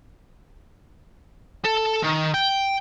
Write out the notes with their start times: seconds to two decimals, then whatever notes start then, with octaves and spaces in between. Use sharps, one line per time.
1.65 A4
2.03 D#3
2.34 G5